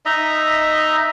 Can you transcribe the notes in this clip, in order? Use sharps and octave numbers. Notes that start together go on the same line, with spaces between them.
D#4 D#5 E5 A#5